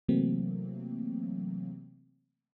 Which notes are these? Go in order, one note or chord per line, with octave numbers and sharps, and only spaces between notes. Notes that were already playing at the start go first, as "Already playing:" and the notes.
C3 E3 F#3 A3 A#3 C4